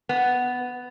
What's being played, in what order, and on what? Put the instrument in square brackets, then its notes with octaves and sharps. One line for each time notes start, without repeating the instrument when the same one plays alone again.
[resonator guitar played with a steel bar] B3